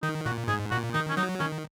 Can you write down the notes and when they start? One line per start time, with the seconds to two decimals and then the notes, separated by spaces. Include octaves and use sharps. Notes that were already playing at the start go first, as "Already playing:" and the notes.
0.02 D#3 D#4
0.25 A#2 F#4
0.48 G#2 G#4
0.71 A#2 F#4
0.93 D#3 D#4
1.09 C#4
1.17 F#3 D#4
1.39 D#3 C#4